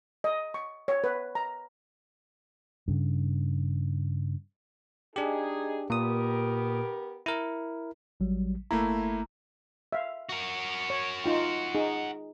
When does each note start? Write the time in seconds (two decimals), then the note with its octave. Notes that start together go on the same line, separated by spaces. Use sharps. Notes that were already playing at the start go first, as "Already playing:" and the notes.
0.24 D#5
0.54 C#6
0.88 C#5
1.04 B4
1.35 A#5
2.88 G2 C#3
5.16 G#3 D4 D#4 G4 G#4
5.90 A#2 B3 G4 A#4 D#6
7.26 E4 A#4
8.20 A1 F#3 G3
8.71 G1 A3 A#3 E4 A#5
9.93 E5 F5
10.29 F#4 A#4
10.90 C#5
11.24 D#4 F4 G5
11.75 D#4 G#4